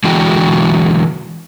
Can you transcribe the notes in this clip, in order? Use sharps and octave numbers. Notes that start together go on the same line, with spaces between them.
D3 E3 G#3 F#4 G5